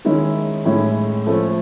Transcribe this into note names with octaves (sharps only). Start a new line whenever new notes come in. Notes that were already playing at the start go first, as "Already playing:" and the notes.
D#3 G#3 C#4 E4
A2 E3 G#3 C#4 E4
F3 A3 C#4